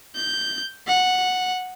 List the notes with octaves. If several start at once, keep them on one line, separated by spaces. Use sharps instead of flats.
G6
F#5